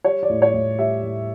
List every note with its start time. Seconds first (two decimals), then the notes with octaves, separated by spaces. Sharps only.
0.04 G3 C#5
0.23 D5
0.29 A2
0.42 C#5
0.54 A2
0.78 G3 E5
1.03 A2